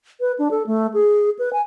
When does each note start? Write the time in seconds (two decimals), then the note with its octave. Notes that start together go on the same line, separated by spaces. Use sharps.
0.20 B4
0.39 D4
0.51 A4
0.67 A3
0.94 G#4
1.39 B4
1.53 G#5